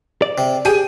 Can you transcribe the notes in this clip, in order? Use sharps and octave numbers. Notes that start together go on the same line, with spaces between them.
D5
C3
G4 G#4 G5 D#7